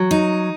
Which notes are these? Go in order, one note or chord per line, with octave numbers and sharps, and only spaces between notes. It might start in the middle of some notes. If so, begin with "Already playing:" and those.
Already playing: F#3
D#4